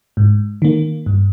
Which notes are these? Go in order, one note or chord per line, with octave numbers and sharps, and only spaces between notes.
G#2
D#3 A#3
G2